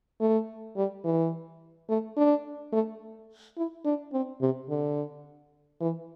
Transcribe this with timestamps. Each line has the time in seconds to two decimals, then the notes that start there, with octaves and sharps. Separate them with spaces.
0.21 A3
0.77 G3
1.05 E3
1.89 A3
2.17 D4
2.72 A3
3.57 E4
3.85 D4
4.13 C4
4.41 C3
4.69 D3
5.81 E3